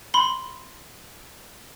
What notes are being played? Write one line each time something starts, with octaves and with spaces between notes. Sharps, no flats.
B5 C6 F#7 G7